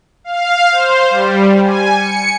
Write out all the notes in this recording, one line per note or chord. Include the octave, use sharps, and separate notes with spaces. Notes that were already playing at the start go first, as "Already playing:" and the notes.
F5
C5
G3
G#5
C#7